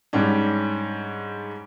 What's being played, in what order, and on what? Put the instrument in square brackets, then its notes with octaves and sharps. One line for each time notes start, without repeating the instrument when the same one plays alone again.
[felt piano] G#2 G3 C#4 D4